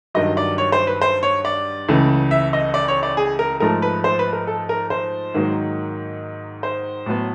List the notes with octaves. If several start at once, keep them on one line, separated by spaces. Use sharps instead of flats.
G2 D#3 F#3 D#5
D5
C#5
C5
B4
C5
C#5
D5
C#2 C#3 E3 A3
E5
D#5
D5
C#5
D5
G#4
A#4
G#2 F3 A3 A#4
B4
C5
B4
A#4
A4
A#4
C5
G#2 D#3 F#3 A#3
C5
A2 F#3 B3